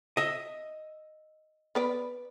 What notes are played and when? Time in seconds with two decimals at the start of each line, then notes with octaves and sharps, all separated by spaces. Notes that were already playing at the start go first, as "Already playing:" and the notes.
0.17 D#5 E5
1.75 B3 B4 D5